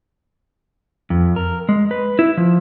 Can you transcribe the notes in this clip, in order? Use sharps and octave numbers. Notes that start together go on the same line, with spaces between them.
F2
A#4
G#3
B4
E4
F3